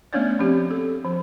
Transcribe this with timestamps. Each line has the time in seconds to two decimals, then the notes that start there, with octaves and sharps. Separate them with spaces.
0.13 A3 B3 C#4 D4 C#5 D5
0.39 F3 C4 G4
0.71 A4
1.05 F3